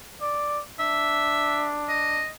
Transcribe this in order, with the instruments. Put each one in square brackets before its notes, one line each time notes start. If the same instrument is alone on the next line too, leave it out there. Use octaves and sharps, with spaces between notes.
[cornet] D5
[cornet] D4 [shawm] E5
[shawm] D#5